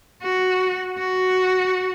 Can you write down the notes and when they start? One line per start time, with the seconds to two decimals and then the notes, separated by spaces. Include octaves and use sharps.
0.22 F#4
0.98 F#4